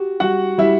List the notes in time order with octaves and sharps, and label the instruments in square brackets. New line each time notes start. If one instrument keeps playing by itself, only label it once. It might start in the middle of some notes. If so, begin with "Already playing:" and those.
Already playing: [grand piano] F#4 [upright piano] G4
[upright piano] G3 [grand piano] F#4 F#5
[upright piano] G3 [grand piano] E4 E5